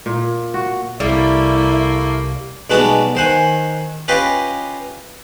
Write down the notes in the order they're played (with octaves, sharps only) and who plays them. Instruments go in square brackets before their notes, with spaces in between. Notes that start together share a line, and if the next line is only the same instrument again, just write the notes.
[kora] A#2
F#4
[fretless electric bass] C2 [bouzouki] G3 [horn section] A3 A#3 [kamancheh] E4
[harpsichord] B1 G3 G#3 B3 F#4 A5
D#3 C5 F#5 G#5
C#4 F4 G4 B4 D#5